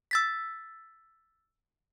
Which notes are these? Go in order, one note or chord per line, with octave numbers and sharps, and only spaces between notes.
E6 A6 B6